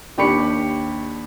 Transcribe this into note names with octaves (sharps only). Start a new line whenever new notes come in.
D#2 D4 G4 B5 C#6 C#7